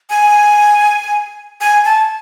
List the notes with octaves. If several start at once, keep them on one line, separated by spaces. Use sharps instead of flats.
G#5
G#5
A5